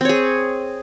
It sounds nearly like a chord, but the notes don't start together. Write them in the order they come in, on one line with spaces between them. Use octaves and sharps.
C4 C#5 G#4